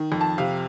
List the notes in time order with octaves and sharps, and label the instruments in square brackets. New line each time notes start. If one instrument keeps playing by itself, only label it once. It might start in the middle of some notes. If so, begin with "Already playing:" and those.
Already playing: [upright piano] D#3
F2
A5
C3 F5